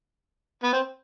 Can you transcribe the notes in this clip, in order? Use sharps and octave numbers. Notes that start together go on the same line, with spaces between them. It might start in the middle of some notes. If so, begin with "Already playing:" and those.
B3
C4